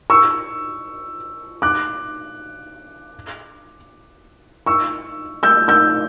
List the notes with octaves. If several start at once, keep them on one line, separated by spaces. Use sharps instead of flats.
C#6 E6
D6 F#6
C#6 E6
E6 G6
E6 G6